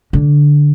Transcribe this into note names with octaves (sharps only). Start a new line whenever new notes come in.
D3